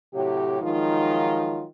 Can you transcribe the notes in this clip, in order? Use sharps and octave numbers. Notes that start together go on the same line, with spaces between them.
A2 C3 F#3 G4
D#3 F3 F#3 G#3 D#4 F4